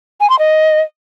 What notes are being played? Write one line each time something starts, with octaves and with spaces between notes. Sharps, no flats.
G#5
C6
D#5